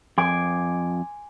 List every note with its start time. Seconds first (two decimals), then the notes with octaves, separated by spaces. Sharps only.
0.18 F2 G#5 C6 D6